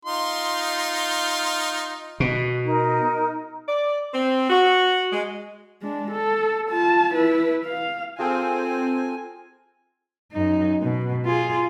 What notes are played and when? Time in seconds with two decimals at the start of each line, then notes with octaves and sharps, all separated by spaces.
0.05 D#4 F4 C6
2.20 B2
2.64 D#4 A#4
3.67 D5
4.13 C4
4.50 F#4
5.11 G#3
5.82 G#3 D4
6.11 A4
6.70 F4 A5
7.13 E4 B4
7.65 F5
8.19 C4 F4 G#4 A4 G#5
10.32 F#2 D#4
10.83 B2
11.25 F4 G#4